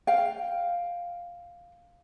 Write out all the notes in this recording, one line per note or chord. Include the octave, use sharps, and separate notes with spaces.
F5 G5